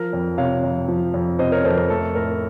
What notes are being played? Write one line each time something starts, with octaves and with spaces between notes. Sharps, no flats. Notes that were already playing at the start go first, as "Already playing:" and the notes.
Already playing: F3 A#4
F2
C3 C#5 F5
F2
F3
F2
C3 C5 D#5
A#4 C#5
F2 A4 C5
A#4
A3 A4
A2 A#4